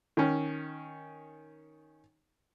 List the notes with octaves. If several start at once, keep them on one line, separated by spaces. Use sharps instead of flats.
D#3 C#4